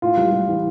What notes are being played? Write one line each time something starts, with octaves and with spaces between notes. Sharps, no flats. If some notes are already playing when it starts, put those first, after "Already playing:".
A2 F4
G3
G3
E3